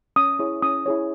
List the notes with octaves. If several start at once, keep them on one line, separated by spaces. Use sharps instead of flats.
C#4 D#6
E4 G#4 C#5
C#4 D#6
E4 G#4 C#5